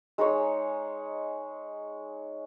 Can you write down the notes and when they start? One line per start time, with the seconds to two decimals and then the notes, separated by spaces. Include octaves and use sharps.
0.18 G#3 D#4 G#4 C#5